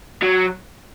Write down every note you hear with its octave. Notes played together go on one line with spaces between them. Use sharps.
F#3